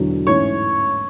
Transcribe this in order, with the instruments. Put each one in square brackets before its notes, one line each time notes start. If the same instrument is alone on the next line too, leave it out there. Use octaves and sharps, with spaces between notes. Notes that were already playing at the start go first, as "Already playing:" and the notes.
Already playing: [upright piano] E1 E2 D3 F#3
[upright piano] A1 G#2 E3 A3 C#4 [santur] C#5